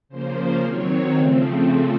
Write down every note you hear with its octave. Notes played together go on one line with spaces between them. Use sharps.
C#3 F3 A#3 C5
D#3 F#3 C4 C#5
C#3 F3 A3 C4